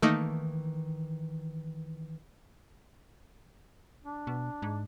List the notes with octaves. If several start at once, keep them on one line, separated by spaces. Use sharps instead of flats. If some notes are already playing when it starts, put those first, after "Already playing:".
D#3 E3 A3 A#3 D#4
D4
B2
G#2